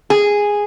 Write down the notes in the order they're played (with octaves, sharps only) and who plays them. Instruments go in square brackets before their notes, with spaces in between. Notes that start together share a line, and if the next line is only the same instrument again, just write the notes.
[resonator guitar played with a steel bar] G#4